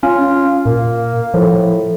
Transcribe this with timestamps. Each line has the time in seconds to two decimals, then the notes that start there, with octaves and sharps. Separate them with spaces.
0.03 C#4 F4
0.66 A#2 A#3
1.34 A2 F3